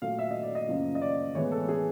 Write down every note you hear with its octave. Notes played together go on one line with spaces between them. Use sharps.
A#2 F#3 A3 F5
E5
D#5
D5
D#5
F#2 C#3 F3 A#3
D#5
D5
A2 E3 G#3 B3 C#5
A4
G#4